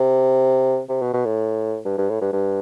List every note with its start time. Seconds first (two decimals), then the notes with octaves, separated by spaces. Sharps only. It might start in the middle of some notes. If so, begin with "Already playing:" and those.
Already playing: C3
0.89 C3
1.01 B2
1.13 B2
1.26 A2
1.85 G2
1.98 G2
2.09 A2
2.21 G2
2.33 G2